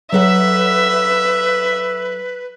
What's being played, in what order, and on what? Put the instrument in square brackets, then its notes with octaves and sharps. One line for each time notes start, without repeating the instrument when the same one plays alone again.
[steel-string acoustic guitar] F#3 A4 F#5 [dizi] B4 [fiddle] E5